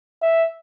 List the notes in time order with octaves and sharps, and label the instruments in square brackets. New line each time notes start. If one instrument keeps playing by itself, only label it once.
[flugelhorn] E5